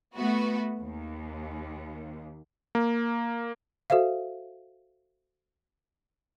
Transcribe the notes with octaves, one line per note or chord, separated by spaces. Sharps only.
A3 B3 F#4 B4
D#2
A#3
F#4 A4 C5 E5 F5